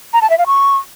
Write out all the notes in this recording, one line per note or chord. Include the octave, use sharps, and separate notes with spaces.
A#5
A5
E5
F5
C#6